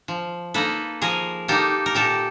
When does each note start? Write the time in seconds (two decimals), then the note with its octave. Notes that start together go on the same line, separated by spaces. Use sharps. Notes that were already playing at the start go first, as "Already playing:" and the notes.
0.08 F3
0.54 A#3 D#4 A4 B4
1.02 F3 G#4 A#4
1.48 A#3 D#4 G4 A4
1.86 A#4
1.95 A#2 G4 A4